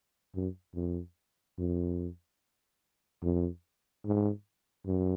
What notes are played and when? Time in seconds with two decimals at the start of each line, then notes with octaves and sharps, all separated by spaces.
0.35 F#2
0.75 F2
1.58 F2
3.23 F2
4.05 G#2
4.86 F#2